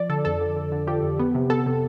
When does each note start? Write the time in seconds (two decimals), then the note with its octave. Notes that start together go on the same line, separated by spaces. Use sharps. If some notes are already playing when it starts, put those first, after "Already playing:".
Already playing: F3 D5
0.09 D3 A4
0.25 F2 A4
0.41 D3
0.56 D3
0.72 D3
0.87 F3 G4
1.03 F2
1.19 B3
1.35 C3
1.50 B3 A4
1.66 C3